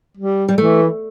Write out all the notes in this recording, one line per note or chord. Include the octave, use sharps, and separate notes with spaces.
G3
G3
E3 A3